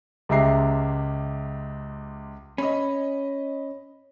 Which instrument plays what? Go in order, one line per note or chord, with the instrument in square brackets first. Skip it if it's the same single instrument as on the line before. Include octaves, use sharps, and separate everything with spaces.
[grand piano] C#2 G#3 G4 E5 A#5 C7
[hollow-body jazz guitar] C#4 [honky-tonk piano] D#5 B5